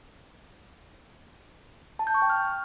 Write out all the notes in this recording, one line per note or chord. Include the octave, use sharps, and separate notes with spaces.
A5
G6
C#6
G5
F6